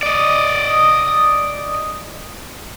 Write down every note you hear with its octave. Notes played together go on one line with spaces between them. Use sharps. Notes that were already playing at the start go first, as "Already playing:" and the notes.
D5 D#5